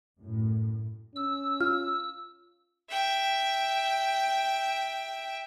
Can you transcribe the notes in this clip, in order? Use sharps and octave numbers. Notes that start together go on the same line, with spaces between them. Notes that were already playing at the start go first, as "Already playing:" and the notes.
F#2 A2
C#4 E6
F4 F6
E5 G5